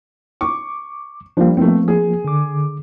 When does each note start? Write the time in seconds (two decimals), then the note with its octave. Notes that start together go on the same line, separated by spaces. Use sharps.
0.41 C#6 D6
1.37 F3 G3 A#3 D4
1.57 A3 B3 C4
1.88 G#4
2.24 D3 D6